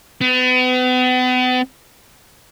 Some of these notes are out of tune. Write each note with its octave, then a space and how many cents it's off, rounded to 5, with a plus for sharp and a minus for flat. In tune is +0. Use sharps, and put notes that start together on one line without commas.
B3 +40